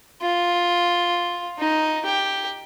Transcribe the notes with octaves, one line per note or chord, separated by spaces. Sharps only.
F4
D#4
G4